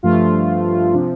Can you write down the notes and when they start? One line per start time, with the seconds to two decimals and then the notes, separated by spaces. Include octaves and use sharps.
0.03 G2 F3 A3 F4
0.93 C3 F3 D4